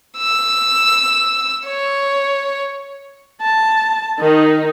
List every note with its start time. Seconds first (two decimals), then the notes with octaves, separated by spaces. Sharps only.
0.18 E6
1.67 C#5
3.41 A5
4.20 D#3 D#4